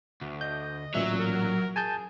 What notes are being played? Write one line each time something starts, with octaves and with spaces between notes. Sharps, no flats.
D2
D#5 G6
A1 A#2 F#3 E5
A#4
G#4 G#5 A5 G6